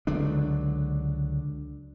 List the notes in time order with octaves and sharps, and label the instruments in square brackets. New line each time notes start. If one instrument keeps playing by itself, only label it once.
[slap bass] C#2 D3 F#3 D4